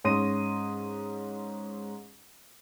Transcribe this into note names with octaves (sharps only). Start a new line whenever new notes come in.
G#2 C#4 C6 D#6 A#6 D#7